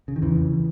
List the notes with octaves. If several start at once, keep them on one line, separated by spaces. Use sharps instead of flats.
C#3
D#3
E2 C#3 E3
F2